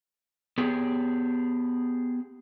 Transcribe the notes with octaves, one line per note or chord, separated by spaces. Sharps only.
B3 G4 G#4